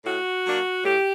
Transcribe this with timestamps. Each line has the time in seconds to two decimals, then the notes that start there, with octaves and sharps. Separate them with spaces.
0.05 A2 F#4
0.45 F#3 A#3 D4
0.84 A2 G4